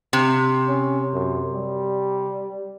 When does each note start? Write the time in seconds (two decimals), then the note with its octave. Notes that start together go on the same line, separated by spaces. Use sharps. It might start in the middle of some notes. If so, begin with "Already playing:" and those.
0.13 C3
0.68 C#4
1.14 F#2
1.54 G3